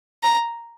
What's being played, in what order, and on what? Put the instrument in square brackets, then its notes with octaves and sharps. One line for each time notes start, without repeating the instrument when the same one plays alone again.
[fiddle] A#5